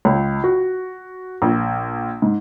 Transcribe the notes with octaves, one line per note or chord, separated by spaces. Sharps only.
C#2
F#4
A#1
G#2